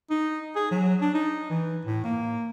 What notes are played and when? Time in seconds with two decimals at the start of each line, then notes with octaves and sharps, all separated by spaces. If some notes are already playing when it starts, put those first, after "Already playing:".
0.10 D#4
0.55 G#4
0.71 F#3
1.01 D4
1.14 D#4
1.50 E3
1.85 A2
2.04 A#3